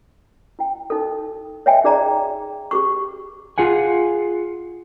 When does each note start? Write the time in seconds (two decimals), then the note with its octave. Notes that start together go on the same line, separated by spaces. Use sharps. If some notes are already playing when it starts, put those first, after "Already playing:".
0.59 E4 G5
0.90 D#4 A4
1.66 C#5 D#5 E5 G5 G#5
1.84 D#4 G#4 D5 A#5
2.71 G4 G#4 C#6
3.58 F4 G#4 F#5 G#5